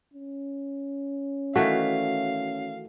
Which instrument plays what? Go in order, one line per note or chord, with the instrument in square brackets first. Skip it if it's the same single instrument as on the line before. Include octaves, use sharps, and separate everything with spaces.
[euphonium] C#4
[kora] D#3 E3 A3 [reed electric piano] F#4 [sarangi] F5